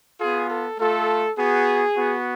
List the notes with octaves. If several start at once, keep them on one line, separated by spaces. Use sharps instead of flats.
B3 F4 G#4
A4
A3 F4 A4
B3 F#4 G#4
B3 F#4